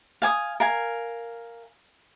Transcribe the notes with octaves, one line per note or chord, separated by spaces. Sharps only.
F5 G#5 D#6
A#4 F5 G#5